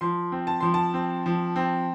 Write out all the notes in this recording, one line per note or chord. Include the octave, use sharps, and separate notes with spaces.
F3 C6
C4
A5
F3 C6
A5
C4
F3
C4